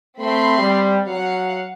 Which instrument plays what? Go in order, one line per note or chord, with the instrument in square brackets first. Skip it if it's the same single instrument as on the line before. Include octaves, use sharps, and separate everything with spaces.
[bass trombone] A3 [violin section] C4 B5 C6
[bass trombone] G3
[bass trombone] F#3 [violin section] F5 F#5